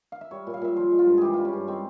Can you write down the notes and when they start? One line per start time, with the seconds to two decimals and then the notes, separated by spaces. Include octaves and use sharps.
0.12 F5
0.21 E5
0.31 G3 C#5
0.47 A#2
0.54 F5
0.62 A#2 E5
0.76 F3 C5
0.91 G#3
0.99 F4
1.07 G2
1.18 E3 G4 G#4
1.34 G3 F4
1.45 C#4
1.53 G2
1.68 G#3 C4